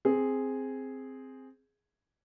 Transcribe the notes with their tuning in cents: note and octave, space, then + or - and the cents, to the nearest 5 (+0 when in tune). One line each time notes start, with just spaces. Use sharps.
C4 +0 G#4 +0